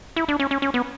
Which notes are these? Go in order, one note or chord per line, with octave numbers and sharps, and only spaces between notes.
E4
D4
C#4
C#4
C#4
B3